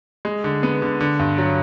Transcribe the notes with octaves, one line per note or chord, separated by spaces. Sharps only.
G#3
D3
B3
D3
D3
G2
F#3